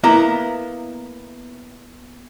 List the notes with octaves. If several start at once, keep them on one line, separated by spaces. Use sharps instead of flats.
A#3 B3 E4 A#5